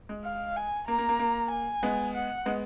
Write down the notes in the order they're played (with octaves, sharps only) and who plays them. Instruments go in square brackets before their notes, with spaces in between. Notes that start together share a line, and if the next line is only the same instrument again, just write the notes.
[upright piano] G#3
[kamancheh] F5
G#5
[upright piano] A#3 [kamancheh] A#5
[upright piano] A#3
A#3
A#3
[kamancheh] G#5
[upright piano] G#3 B3
[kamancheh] F#5
[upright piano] G#3 B3